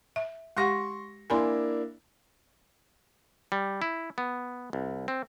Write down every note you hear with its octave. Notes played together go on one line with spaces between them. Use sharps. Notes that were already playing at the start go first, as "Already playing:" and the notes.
E5
G#3 G4 F#5 C6 C#6 A#6
A#3 D4 E4 G#5 B5 C6
G3
E4
B3
C2
C4